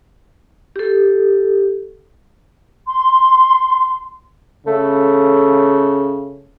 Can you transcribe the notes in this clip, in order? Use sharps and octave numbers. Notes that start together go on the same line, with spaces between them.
G4 A4
C6
C#3 A3